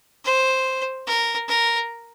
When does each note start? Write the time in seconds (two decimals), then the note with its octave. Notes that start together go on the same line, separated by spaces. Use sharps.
0.25 C5
1.07 A#4
1.48 A#4